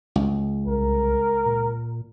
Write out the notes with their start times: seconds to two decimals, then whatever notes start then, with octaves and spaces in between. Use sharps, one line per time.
0.16 C#2
0.67 C2 A#4
1.46 A#2